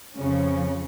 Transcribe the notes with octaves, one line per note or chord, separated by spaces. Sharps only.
F2 C#3 F3 C#4